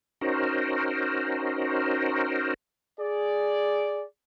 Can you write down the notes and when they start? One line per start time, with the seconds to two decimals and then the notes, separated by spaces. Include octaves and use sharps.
0.21 C#4 D#4 F#4 A#4 C5
3.00 G#4 D5